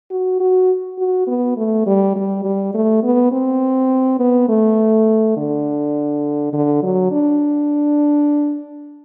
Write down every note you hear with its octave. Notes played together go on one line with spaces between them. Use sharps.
F#4
F#4
F#4
B3
A3
G3
G3
G3
A3
B3
C4
B3
A3
D3
D3
F#3
D4